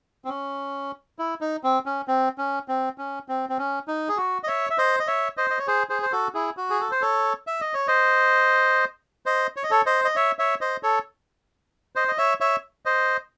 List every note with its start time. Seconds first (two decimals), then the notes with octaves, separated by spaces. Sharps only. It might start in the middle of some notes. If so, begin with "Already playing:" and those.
0.25 C4
0.29 C#4
1.19 E4
1.41 D#4
1.64 C4
1.86 C#4
2.08 C4
2.38 C#4
2.68 C4
2.98 C#4
3.29 C4
3.49 C4
3.58 C#4
3.88 D#4
4.09 G#4
4.17 F#4
4.43 D#5
4.47 C#5 E5
4.70 E5
4.78 C5 D#5
5.00 D#5
5.07 C#5 E5
5.37 C5 D#5
5.50 D#5
5.59 C#5
5.67 G#4 C5
5.89 G#4 C5
6.02 C5
6.12 F#4 A4
6.34 E4 G#4
6.57 F#4
6.70 G#4
6.80 A4
6.91 C5
7.02 A4 C#5
7.47 E5
7.61 D#5
7.74 C#5
7.87 C5 D#5
9.26 C5 D#5
9.57 C#5
9.64 D#5
9.71 A4 C#5
9.86 C5 D#5
10.05 D#5
10.16 C#5 E5
10.39 C#5 E5
10.61 C5 D#5
10.83 A4 C#5
11.96 C5 D#5
12.08 D#5
12.18 C#5 E5
12.41 C#5 E5
12.85 C5 D#5